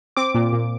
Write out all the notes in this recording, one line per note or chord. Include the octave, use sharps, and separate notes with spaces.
C4 D6
A#2
A#2